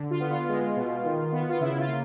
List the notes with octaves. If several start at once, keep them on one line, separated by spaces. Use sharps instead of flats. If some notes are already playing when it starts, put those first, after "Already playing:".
Already playing: D3
F4
B3
F4
G#3
B2
D#3
B3
F4
C#3 E4
F4
A#3